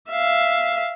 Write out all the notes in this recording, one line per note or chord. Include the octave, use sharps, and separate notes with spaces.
E5 F5